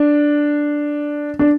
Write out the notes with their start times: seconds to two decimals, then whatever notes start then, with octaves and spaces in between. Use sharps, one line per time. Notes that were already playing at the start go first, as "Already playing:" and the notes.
Already playing: D4
1.39 D4